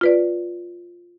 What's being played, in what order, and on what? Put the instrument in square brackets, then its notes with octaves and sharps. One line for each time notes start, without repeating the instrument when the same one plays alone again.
[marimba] F4 B4 D5